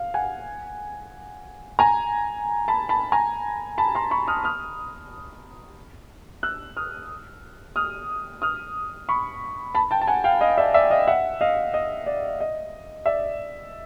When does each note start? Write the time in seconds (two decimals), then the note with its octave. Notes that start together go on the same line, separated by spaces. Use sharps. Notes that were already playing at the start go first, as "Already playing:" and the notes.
Already playing: F5
0.14 F#5 G#5
1.79 G#5 A#5
2.68 A5 B5
2.89 A5 B5
3.12 G#5 A#5
3.78 A5 B5
3.95 A#5 C6
4.11 B5 C#6
4.28 D#6 F6
4.44 D#6 F6
6.43 E6 F#6
6.77 D#6 F6
7.76 D#6 F6
8.42 D#6 F6
9.09 B5 C#6
9.75 A5 B5
9.91 G5 A5
10.01 A5
10.07 F#5 G#5
10.24 F5 G5
10.41 D#5 F5
10.58 D5 E5
10.74 D5 E5
10.90 D#5 F5
11.07 E5 F#5
11.41 D#5 F5
11.74 D#5
12.06 D5
12.40 D#5
13.06 D5 E5